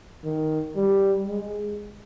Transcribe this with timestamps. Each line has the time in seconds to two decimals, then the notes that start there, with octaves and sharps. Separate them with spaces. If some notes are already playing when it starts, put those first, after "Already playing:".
0.24 D#3
0.76 G3
1.27 G#3